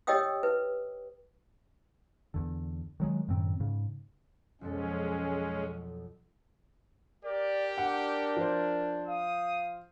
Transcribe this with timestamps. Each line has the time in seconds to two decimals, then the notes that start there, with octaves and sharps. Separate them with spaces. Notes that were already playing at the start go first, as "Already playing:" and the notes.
0.07 G4 C#5 D#5 G5 D#6 E6
0.43 B4
2.34 E2 D3
3.00 D#3 F#3 G#3
3.28 F#2 A2 D#3 C4
3.60 G#2 C#3
4.61 B1 F2 G#3 C#4 A4
7.25 G4 A#4 D5
7.78 D4 F#5
8.37 F3 C5
9.07 F5 D#6